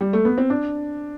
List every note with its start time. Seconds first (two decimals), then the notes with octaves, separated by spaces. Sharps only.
0.01 G3
0.13 A3
0.25 B3
0.38 C4
0.50 D4